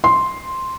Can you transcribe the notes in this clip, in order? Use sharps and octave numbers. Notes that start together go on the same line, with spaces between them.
C6